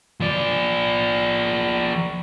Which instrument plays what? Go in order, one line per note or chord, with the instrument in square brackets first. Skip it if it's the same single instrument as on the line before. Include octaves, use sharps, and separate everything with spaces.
[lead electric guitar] F3 D5